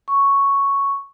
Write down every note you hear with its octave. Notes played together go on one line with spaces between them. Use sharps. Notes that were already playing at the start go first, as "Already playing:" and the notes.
C#6